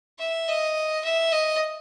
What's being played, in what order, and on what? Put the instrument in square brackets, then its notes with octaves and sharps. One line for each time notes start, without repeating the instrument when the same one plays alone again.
[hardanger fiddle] E5
D#5
E5
D#5